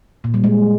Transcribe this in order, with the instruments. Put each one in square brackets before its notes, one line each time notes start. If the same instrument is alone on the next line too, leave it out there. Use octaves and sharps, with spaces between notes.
[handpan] A#2
G3
G#3